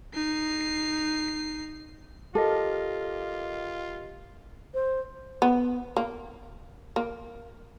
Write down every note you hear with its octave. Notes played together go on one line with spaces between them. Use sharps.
D#4 C7
F4 G4 A4 A#4 D#5
C5
B3
A#3
A#3